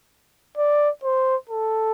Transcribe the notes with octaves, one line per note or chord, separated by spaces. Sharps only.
D5
C5
A4